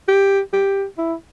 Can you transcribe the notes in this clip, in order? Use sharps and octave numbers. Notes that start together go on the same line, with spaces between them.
G4
G4
E4